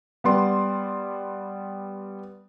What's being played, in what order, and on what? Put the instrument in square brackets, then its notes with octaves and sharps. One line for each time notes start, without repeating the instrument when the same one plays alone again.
[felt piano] G3 B3 D5 C6